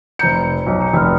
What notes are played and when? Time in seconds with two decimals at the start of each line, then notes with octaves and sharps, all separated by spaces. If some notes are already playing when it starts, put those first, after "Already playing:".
0.19 F1 C5 A#5 G6 C#7
0.66 B1
0.81 A#5 C#7
0.93 F1 D#6 F6